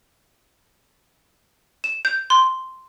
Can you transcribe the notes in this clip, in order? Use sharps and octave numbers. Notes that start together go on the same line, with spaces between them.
E7
G6
C6